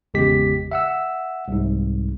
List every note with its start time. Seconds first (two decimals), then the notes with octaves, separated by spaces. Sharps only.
0.14 G#1 E2 C#3 G#3 G4 B6
0.71 E5 F#5 E6
1.48 C2 G#2